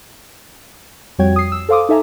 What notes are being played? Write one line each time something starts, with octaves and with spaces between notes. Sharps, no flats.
F2 G3 F#4 C#5 G5 G#6
D#6 C7
E6
A4 C5 F5 C6 D6 D#6
D#4 A4 E5 G#5 A#5